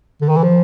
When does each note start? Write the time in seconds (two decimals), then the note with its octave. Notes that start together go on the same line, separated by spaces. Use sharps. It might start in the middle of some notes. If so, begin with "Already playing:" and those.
0.21 D3
0.29 D#3
0.36 E3
0.43 F3